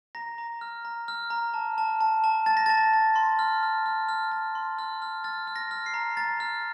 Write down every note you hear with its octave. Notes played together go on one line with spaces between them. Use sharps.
A#5 A#6
A#5
F6
A#5
F6
A#5
A5
A5
A5
A5
A5 A6
A#6
A5 A6
A5
C6
F6
F6
F6
F6
F6
C6
F6
F6
F6 A6
F6
A#6
F6
C7
A#5
A#5 A6
F6